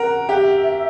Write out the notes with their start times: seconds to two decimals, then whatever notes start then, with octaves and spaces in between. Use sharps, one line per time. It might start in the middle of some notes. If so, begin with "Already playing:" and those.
Already playing: F#4 A#4 F#5
0.29 G4 E5